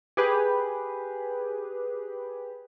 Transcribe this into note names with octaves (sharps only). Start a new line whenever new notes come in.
G4 G#4 B4